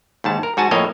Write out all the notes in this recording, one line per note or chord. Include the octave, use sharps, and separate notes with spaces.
D#2 G#2 A5
A#4
G#2 F#4 G#5 A5
F2 A2 A#3 C#5 D#5 F5